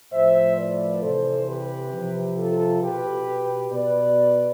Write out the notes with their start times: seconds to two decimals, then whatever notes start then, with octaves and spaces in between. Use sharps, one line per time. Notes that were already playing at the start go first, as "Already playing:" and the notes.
0.12 A2 F3 C5 E5
0.56 B4 D5
1.02 C3 E3 A4 C5
1.46 G4 B4
1.92 C3 F3
2.37 F4 A4
2.81 B2 G4 B4
3.71 B2 B4 D5